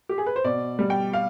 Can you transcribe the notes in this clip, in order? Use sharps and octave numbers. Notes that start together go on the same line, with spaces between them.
G4
G#4
B4
C5
B2 D5
G3
G5
F5